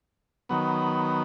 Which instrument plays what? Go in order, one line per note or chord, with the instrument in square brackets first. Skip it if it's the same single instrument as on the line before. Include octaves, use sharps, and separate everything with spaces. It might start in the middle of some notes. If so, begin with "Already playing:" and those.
[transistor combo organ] D#3 F#3 B3